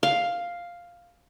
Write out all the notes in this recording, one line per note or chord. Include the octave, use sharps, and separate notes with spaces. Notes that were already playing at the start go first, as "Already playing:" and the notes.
F5